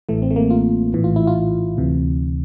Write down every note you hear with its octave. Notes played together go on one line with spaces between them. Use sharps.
A1 A2 E3 A3
C4
A3
A#3
F4
A#1 A2 E3
F4
E4
F4
D2 C3 E3